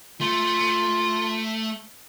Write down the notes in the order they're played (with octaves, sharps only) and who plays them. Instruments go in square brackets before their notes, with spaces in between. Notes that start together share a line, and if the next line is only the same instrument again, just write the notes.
[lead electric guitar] A3 [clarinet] F4